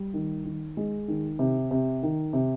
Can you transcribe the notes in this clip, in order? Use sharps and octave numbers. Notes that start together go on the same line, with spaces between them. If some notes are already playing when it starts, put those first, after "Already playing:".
Already playing: G3
D#3
D#3
G#3
D#3
C3
C3
D#3
C3